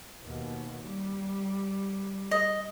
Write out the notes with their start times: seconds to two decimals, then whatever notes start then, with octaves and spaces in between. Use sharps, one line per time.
0.24 D#2 B2
0.83 G3
2.31 D#5